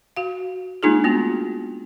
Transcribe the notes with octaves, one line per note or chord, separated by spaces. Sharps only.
F#4 F5
G#3 A#3 D4 D#4 F4 G#4
A3 B3 F4 F#4